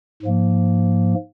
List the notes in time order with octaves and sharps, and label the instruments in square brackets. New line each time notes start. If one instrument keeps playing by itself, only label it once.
[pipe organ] G#2 F3 A#3